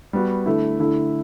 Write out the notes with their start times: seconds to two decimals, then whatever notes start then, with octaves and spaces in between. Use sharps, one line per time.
0.13 G3 B3 F#4
0.46 D3 A3 E4
0.79 D3 A3 E4